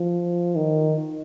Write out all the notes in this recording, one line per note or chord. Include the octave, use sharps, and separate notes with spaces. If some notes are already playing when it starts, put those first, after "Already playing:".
Already playing: F3
D#3